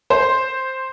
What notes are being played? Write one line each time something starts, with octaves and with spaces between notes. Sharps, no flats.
C5